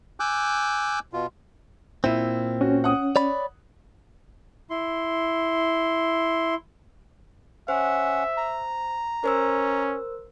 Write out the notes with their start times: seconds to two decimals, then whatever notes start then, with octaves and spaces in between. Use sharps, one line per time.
0.20 G#5 D6 E6 F#6 G6
1.13 B2 F4
2.04 A#2 C4 E4
2.61 C#4 F#4
2.84 F#5 D#6
3.16 C#5 D5 B5
4.70 E4 C6
7.68 C#4 C5 E5 F#5
8.37 A#5
9.24 C#4 A#4 C5 E6